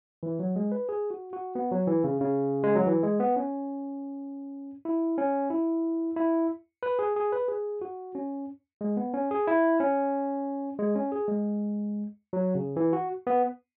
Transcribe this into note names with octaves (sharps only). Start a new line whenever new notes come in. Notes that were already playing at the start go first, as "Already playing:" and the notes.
E3
F#3
G#3
B4
G#4
F#4
F#4
B3
F#3
E3
C#3
C#3
G#3
F#3
E3
G#3
B3
C#4
E4
C#4
E4
E4
B4
G#4
G#4
B4
G#4
F#4
C#4
G#3
B3
C#4
G#4
E4
C#4
G#3
C#4
G#4
G#3
F#3
C#3
E3
F#4
B3